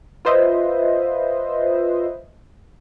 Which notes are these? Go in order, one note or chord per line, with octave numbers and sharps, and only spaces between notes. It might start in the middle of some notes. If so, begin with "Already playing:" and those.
F4 B4 C5 D#5 E5